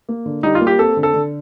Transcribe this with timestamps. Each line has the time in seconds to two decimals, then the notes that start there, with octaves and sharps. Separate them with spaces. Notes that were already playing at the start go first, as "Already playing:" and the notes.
0.09 A#3
0.26 D3
0.43 G3 D#4
0.55 F4
0.61 A#3
0.67 G4
0.79 C4 A4
0.97 D3
1.03 A4
1.14 D3